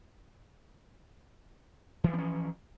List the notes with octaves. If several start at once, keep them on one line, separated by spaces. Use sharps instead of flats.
E3 F3 C4 C#4